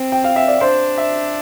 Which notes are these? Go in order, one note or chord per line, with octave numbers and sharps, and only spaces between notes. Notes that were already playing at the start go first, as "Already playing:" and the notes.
Already playing: C4
G5
F5
E5
D5
D4 C5
E5